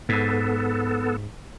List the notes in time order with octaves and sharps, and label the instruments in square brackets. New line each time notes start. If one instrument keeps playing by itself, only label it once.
[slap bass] G#2 [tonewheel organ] B3 A4